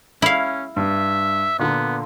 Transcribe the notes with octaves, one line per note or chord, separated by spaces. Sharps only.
C#4 E4 F5
G2 E5
A#2 D3 B3